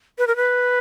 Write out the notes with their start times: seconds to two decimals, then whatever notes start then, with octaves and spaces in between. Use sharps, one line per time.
0.18 B4
0.27 A#4
0.36 B4